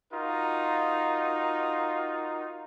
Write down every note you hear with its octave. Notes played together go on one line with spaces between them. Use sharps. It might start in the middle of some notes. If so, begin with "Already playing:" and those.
D#4 F4 F#4 A#4